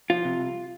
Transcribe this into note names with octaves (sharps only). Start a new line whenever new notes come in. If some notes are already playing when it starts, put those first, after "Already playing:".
F3 F4
C3
C2